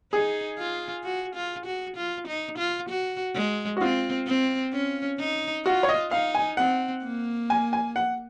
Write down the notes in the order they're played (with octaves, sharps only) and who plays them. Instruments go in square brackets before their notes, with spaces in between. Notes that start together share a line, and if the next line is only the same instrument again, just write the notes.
[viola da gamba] D#4 [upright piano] G#4
[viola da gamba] F4
F#4
F4
F#4
F4
D#4
F4
F#4
G#3
[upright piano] F#4
[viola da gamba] C4 [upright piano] F4
[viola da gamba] C4
C#4
D#4
[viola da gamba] F4 [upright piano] F#4
[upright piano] C#5
D#5
[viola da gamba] D#4 [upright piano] F5
[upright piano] G#5
[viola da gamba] C4 [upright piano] F#5
[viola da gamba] A#3
[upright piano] G#5
G#5
F#5